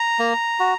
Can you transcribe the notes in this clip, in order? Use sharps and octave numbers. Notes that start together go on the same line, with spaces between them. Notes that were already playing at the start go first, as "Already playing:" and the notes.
Already playing: A#5
A#3
F#4